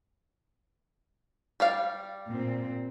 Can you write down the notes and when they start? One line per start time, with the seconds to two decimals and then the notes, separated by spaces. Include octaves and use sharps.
1.60 G3 D5 F5
2.28 A#2 C4